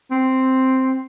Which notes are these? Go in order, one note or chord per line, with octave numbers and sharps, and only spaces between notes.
C4